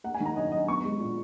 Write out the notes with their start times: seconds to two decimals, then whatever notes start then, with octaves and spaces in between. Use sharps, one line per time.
0.04 A#3 F#5
0.14 G#5
0.20 D#3
0.26 A#5
0.36 F#2 D#5
0.52 F#2 D#5
0.68 B3 C#6
0.84 G#3
1.00 A#2